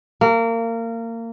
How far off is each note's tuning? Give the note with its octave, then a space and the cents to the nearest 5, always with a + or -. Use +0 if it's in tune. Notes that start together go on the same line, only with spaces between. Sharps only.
A#3 -25